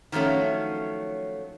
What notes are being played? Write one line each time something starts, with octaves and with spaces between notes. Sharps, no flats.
D#3 F3 F#3 A3 C#4